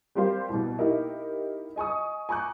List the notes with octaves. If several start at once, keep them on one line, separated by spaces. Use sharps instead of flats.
G3 C4 G4 A#4 C5 F5
C2 B2
A#3 D#4 E4 G4 A#4
D#5 G#5 C#6 D#6
G#5 A#5 C#6 D6 F#6